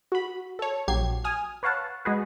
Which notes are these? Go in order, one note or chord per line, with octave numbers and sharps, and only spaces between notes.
F#4 B5
A4 C#5
A#1 F#3 G4 G#6 C7
G#5 D#6 F6
B4 C#5 F5 F#5 A5
G#3 F#4 G#4 B4